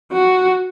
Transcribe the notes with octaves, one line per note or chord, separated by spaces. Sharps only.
F#4